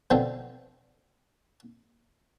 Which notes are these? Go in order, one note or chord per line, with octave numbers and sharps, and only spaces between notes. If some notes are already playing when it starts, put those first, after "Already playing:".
B2 D3 F3 C4